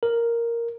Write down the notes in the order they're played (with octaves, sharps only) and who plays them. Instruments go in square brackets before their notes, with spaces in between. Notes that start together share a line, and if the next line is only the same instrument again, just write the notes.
[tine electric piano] A#4